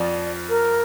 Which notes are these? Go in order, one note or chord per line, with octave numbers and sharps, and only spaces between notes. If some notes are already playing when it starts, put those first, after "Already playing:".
Already playing: F2 F3 D5
A#4